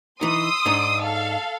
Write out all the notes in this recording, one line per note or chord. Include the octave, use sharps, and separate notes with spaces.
E3 D#4 C6 D#6 E6
G#2 D4 D#4
A4 F5